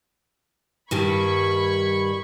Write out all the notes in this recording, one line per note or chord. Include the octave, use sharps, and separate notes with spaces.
G2 D#3 G3 B5 C#6 G#6